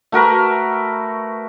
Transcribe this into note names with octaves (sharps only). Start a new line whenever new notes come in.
A3 F#4 A#4 B4